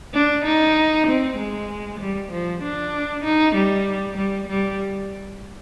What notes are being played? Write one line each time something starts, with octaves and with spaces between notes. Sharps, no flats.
D4
D#4
C4
G#3
G3
F3
D4
D#4
G3
G3
G3